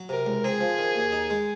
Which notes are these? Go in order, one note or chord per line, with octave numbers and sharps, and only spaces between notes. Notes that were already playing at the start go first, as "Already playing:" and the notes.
Already playing: F#3
C3 A#4
C#2
C4 G#4
F3
D#3
D#2
D#4
G#3